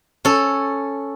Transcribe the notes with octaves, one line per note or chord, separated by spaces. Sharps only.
C#4 A4